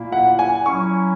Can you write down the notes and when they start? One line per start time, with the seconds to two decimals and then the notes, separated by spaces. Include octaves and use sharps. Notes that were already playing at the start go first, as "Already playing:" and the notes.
Already playing: A#2 A#3 E4
0.12 F#5
0.39 G#5
0.65 F#3 C#4 E4 C#6